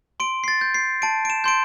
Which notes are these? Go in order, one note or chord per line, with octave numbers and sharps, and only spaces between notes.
C6 D7
C7
A6
G6
C7
A5 D7
D7
E7
C6 G6 D7